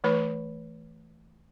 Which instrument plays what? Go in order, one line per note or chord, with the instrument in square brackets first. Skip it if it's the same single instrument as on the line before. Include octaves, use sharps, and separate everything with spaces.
[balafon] E3 A3 B4 B5